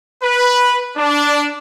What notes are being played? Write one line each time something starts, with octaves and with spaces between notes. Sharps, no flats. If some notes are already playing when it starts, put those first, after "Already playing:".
B4
D4